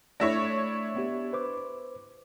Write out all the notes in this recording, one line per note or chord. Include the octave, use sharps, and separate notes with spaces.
A3 D4 E4 C#5 A#6
B3 G4
B4 C5 D6